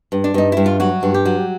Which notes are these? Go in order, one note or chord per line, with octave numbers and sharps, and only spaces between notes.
G2
D4
G2 D#4
G2 E4
F4
F#3 F#4
G2
G4
F#3